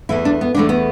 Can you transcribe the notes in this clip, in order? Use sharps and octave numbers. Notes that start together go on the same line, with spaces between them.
E2 E3 A3 E4
D4
B3
E2 E3 A3 D4
B3